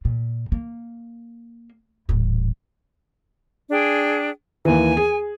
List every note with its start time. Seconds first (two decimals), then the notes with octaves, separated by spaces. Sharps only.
0.05 A#2
0.52 A#3
2.09 D#1 A1
3.71 D4 G#4 G5
4.65 D#2 E3 G#5
4.97 G#4